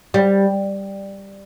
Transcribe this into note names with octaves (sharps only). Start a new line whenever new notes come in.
G3